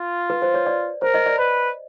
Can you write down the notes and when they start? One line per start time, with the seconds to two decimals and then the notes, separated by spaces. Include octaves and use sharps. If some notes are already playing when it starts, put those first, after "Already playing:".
Already playing: F4
0.30 B4
0.42 C5
0.54 C#5
0.67 D5
1.02 A#4 C5
1.14 D#5
1.26 D5
1.38 B4